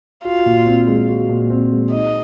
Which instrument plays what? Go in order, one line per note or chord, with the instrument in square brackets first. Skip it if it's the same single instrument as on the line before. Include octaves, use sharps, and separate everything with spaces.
[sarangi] F4 [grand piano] F#4
[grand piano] A#2
C4
G#3
F#4
A#2
C4
G#3
[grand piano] D#4 [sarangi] D#5